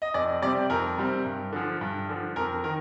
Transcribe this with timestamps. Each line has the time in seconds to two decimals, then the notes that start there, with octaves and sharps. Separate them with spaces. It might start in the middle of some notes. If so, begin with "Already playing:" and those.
0.02 D#5
0.14 F2 D5
0.42 C3 G3 C4 D5
0.70 F2 A#4
0.97 C3 G3 C4
1.25 G2
1.52 D3 F3
1.81 G2
2.09 D3 F3
2.36 F2 A#4
2.64 D#3 A#4